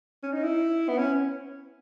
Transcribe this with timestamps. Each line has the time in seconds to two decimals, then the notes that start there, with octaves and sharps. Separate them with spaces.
0.23 C#4
0.33 D#4
0.43 E4
0.89 B3
0.98 C#4